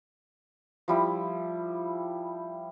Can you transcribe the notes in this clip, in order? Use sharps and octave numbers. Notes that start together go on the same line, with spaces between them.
F3 G3 E4